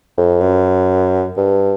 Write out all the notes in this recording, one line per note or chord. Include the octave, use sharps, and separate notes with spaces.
F2
F#2
G2